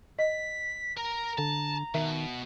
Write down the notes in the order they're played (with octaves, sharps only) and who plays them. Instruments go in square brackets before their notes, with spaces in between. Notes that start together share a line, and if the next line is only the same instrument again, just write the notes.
[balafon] D#5 [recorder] B6
[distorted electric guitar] A#4 [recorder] A#5
[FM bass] D3 [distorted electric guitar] A5
[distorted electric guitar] B2 [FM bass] D#3 [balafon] E5